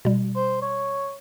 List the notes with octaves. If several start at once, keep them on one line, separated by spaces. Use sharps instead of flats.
B2 G3
C5
C#5